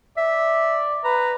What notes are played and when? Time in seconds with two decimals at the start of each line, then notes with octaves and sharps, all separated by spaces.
0.17 D5 E5
1.04 B4 A#5